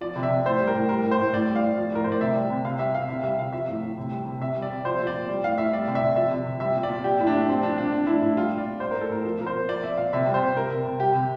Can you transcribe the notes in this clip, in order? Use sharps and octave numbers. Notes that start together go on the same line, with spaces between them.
F3 D5
C3
E5
C3
A2 C5
G3
A#4
A2
G3 A#4
A2
C5
A2
A2 D5
G3
F5
A2
F3
A2 A#4
A2 C5
D5
C3 E5
G3
C3
C3 F5
G3 E5
C3 F5
C3 E5
F5
G3 E5
C3 F5
F3 E5
A2
A2
C3
G3
C3
C3 E5
G3
D5
C3
F3 C5
A#2
D5
A#2
G3
A2 F5
A2 E5
G3 D5
C3
E5
C3
F3 E5
C3
C3
G3 E5
A#2
D5
A#2
F3 G4
A2 E4
D4
A2
F3 C4
A#2 D4
A#2 D4
F3 D4
A2 E4
A2 E4
G3 F4
A#2
D5
A#2
G3 C5
A2 A#4
A4
A2 A#4
F3
A#2 A#4
C5
A#2
F3 D5
A#2 E5
A#2 F5
C3 E5
G3
C5
C3
G3 A#4
C3
C3
G3 G4
C3